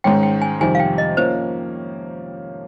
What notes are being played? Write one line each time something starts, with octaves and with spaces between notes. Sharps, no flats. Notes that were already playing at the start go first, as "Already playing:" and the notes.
G#2 D#3 G#3 C#4 G5
G5
G#5
F2 C3 D#3 G3 G#5
F5
G5
D#5
F3 A#3 C#4 C5